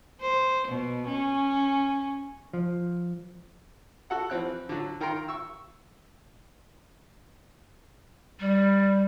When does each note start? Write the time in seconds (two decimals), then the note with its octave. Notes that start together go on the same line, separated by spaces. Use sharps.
0.21 C5
0.68 B2
1.08 C#4
2.53 F3
4.10 F#4 A4 F#5
4.30 E3 F3 C4 F#6
4.69 D3 F#3
5.00 D#3 A#4 G5 A#5 C6
5.28 C#6 E6
8.40 G3